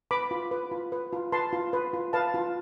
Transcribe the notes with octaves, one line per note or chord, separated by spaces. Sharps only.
B4 B5 D6
F4
B4
F4
B4
F4
B4 A5 C6
F4
B4
F4
B4 F5 A5
F4